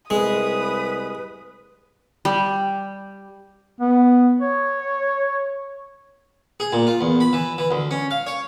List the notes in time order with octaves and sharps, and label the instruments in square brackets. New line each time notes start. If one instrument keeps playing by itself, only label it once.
[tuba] C2 [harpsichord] G#3 [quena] B4 [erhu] D#6
[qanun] G3
[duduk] B3
C#5
[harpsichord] G#4
A#2
F4
E2
B5
E3
E3
D2
C#4
F5
C#5